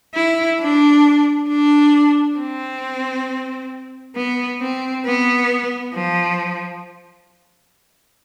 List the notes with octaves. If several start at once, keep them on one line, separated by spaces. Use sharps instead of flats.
E4
D4
D4
C4
B3
C4
B3
F3